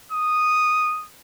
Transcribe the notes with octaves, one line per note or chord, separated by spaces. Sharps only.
D#6